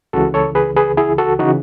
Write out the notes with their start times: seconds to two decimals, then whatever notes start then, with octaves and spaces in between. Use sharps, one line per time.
0.13 C#2 C#3 E3 F#4 A4
0.34 A4 C#5
0.55 G#4 B4
0.77 G#4 B4
0.97 E4 G#4
1.18 F#4 A4
1.39 C#3 E3 D#4 F#4